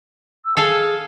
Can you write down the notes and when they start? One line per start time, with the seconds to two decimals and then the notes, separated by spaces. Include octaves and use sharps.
0.44 E6
0.57 G#4 A4 F5 G#5